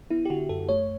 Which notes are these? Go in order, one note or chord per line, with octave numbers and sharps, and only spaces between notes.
B3 E4
G4
D3 F#4
F#2 A4
A3 C#5